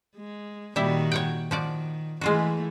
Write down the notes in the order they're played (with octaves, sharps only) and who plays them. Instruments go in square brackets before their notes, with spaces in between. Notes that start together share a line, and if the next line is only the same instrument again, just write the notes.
[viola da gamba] G#3
[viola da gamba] A#2 D#3 F#4 [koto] G3 E4 E5
[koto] C#5 F#5 G5
[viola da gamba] D#3 [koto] F3 F#4 D5
[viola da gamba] E3 A3 [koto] G#3 F4 F#4